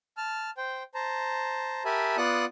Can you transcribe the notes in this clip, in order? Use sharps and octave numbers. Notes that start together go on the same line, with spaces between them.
A5 F6
C5 G5
C5 A5 A#5
G4 A#4 E5 G#5 A5 B5
B3 F4 D5 F#5 D#6 F#6